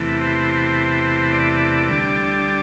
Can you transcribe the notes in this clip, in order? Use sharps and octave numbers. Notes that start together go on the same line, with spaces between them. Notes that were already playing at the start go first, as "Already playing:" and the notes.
Already playing: E2 C3 E3 A3
C5
D5
D2 D3 G3